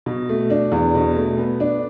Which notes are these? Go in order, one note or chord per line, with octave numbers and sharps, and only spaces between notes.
B2
A3
D4
E2
B2
A3
B3
D4